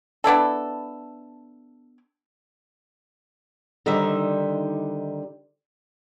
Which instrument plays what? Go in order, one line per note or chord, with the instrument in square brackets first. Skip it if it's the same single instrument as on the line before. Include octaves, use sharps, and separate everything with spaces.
[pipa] B3 D4 E4 A4
[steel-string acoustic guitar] D3 D#3 G3 D#4 C5 E5